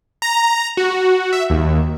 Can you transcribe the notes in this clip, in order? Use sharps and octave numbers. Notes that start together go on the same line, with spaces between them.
A#5
F#4
E5
D#2